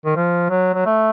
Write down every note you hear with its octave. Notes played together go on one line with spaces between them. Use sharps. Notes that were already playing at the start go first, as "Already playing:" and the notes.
D#3
F3
F#3
F#3
A3